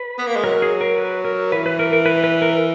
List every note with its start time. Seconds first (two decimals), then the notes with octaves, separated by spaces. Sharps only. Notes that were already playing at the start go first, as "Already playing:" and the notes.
Already playing: B4
0.18 B3
0.27 A#3
0.36 G#3
0.44 F#3 A#4
0.62 G#4
0.81 A#4
0.98 B4
1.25 A#4
1.52 E3 B4
1.66 B4
1.79 A#4
1.93 A#4
2.06 B4
2.24 B4
2.42 A#4